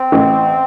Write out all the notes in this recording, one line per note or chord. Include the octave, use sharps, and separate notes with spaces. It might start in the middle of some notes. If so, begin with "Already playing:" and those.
Already playing: C4
A1